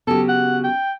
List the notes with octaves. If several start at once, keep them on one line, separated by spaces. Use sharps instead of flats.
C#3 F#3 B3 G4 A4
F#5
G5